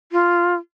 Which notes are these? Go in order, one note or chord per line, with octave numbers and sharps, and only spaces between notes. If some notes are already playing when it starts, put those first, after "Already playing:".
F4